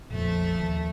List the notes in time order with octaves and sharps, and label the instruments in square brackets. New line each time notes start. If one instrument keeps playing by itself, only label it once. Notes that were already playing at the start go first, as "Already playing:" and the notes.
[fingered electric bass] A#1 F2 [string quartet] F3 A3 E5
[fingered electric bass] D#2